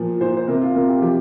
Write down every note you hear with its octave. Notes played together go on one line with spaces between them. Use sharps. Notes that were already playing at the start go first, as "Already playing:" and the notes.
Already playing: A#2 F3
A#2 C5
C5
C3 A#4
F4
C3 A#4
G4
F3 G4